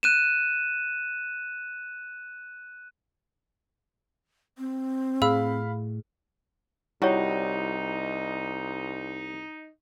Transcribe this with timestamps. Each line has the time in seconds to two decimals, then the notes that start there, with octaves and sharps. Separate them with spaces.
0.03 F#6 D#7 E7
4.58 C4
5.22 A2 G#4 F5 B5 E6
7.02 C2 G3 D#4 E4 F#4 C#5